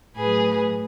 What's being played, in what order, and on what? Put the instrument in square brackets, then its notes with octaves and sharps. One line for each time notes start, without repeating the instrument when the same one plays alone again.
[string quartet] A2 F#3 G#4 B4